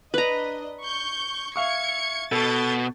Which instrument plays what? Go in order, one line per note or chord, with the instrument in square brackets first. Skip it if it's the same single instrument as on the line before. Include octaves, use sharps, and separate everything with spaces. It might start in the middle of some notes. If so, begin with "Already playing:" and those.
[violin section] D4 D#5 [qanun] B4 A#5
[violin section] C#6 G6
[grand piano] E5 F5 C#6 [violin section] G#6 C#7
[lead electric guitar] B2 [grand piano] A4 [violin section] G6 A6